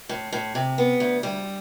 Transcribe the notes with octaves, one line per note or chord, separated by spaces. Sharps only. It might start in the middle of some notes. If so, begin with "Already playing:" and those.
A2
A2
C3
B3
D2
G3